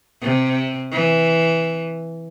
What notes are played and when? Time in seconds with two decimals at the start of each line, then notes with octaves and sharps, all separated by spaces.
0.21 C3
0.92 E3